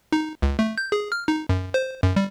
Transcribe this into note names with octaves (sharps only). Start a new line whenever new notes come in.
D#4
C#2
A3
G6
G#4
F6
D#4
F#2
C5
F#2
G3